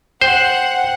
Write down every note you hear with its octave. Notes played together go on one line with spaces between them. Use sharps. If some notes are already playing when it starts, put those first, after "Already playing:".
C5 F#5 G5